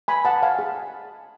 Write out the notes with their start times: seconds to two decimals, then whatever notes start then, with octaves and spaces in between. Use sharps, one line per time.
0.08 G#5 B5
0.25 F#5 A5
0.43 F5 G#5
0.59 G#4